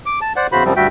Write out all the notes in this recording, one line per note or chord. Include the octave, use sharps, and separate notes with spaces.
D6
A5
C5 D5 F#5
E2 C#3 F#4 C5 B5
F#2 C3 F3 G3 C4
D2 G2 G3 F#4 E5 G5